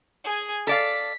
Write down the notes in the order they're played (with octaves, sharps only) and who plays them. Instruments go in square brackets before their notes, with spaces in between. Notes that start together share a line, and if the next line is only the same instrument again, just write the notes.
[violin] G#4 G#5
[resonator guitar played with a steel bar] A4 D5 F5 [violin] B6